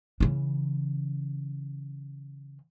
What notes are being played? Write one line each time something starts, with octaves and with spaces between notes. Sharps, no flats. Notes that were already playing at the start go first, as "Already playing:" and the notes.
C#3 E3